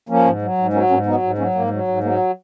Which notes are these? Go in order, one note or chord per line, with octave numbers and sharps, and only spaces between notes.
F3 A#3 C#4
G#2
F#3
G#2
F#3 A#3 C#4
G#2 A#3 C#4
F#3 B3 D#4
G#2
F#3 A#3 C#4
G#2 A#3
F#3
G#2
F#3 A#3